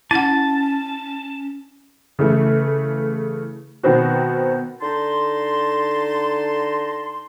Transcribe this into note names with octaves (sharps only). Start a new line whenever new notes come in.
C#4 E4 F#5 A5
C#3 E3 A3
B2 D#3 B3 C4 F#4
D3 D#4 A5 C6